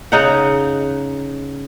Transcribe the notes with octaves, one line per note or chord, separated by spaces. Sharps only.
C#3 D#4 F#5